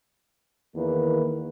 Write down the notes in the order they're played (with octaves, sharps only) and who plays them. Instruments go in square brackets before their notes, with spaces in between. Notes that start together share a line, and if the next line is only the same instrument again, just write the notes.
[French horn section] E2 D#3 A#3 E4 B4